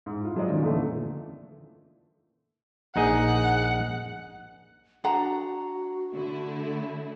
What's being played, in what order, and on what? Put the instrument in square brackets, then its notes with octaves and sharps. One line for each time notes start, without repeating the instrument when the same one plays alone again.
[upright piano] G#2
E4 F4
F3 F#3 G#3 G#4 D5 D#5
D#3 C#4
E2 A#2 D3 E3 A3
[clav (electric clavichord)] A#1 D#4 G#4 [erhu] F#5
[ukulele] D4 F#5 A#5 [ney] F#4
[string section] D3 A3 E4